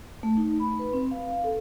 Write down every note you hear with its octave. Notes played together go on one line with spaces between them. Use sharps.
A3
D#4
B5
B4
C4
F5
F5
A4